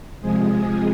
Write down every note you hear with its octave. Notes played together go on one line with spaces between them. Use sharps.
C3 F3 G#3 G#4